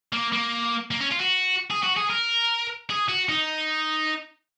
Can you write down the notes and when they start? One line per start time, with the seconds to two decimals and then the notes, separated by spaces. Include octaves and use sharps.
0.12 A#3
0.32 A#3
0.91 A#3
1.01 C#4
1.11 F4
1.20 F#4
1.70 G#4
1.83 F#4
1.96 G#4
2.10 A#4
2.90 G#4
3.09 F#4
3.29 D#4